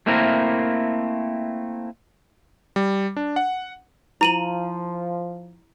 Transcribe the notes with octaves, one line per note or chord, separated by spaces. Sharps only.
A3 A#3 C4 E4 A#4
G3
D4
F#5
F3 E4 A#5 D#7 F#7